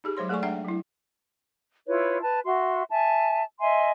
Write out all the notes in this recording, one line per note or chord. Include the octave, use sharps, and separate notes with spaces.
D#4 G4 G#4
F#3 G#3 C5 C#5 C6
A3 G#4 A4 D5 G#5 C#6
G#3 D4 E5 F#5 G5
F#3 E4
E4 F4 B4 C#5
B4 A5
F#4 E5 C6
E5 G#5 A5
D#5 E5 G#5 C6